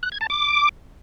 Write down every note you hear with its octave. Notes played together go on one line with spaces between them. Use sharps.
F#6
G#6
A5
D6